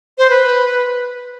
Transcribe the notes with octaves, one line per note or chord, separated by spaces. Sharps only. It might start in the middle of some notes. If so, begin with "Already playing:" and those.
C5
B4